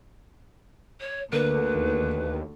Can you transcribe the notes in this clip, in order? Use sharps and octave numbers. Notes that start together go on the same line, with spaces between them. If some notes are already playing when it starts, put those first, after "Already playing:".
C#5
D2 D3 A#3 B4
D#2